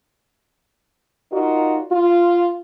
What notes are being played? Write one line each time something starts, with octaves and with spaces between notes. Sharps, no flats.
D#4 F4 F#4 A#4 D5
F4